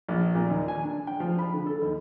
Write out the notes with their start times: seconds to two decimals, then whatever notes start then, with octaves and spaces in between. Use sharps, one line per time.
0.08 A#1
0.35 A#2
0.50 D#2
0.68 G#5
0.82 D4
1.07 G5
1.20 F3
1.39 B5
1.53 D3
1.66 A4
1.82 D#2